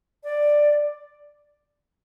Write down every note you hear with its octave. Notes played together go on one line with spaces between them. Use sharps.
D5